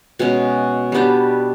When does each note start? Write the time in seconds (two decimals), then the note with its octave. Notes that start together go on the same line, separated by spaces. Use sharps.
0.19 B2 G#3 C#4
0.92 G3 B3 D4 G4